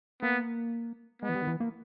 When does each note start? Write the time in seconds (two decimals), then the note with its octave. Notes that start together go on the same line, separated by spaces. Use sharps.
0.22 A#3 B3
1.22 G#3 B3
1.29 E3
1.35 G3
1.42 D#3
1.47 E3
1.60 A#3